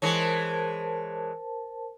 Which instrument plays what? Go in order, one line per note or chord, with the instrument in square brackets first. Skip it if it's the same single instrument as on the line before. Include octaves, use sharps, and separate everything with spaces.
[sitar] E3 G#3 C#5 [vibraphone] A#4 C5 A5